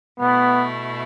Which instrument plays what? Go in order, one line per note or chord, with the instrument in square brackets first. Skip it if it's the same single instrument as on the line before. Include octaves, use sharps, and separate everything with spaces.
[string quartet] B2 A3 E4 [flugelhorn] B3